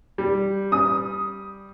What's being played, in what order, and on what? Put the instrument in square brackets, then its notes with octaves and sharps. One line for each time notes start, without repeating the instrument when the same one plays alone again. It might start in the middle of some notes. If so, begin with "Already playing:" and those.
[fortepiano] G3
[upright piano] D#6